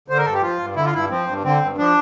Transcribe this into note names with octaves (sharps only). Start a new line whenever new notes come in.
D3 C5
A#4
G2 A4
G4
F3 F4
G2
D3 E4
F4
G2 E4
F3 C4
G2
D3 C4
G2
F3 D4